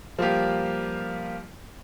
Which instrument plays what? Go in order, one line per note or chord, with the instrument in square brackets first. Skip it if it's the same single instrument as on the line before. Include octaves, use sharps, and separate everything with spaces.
[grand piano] F3 G3 A#3 F4 G4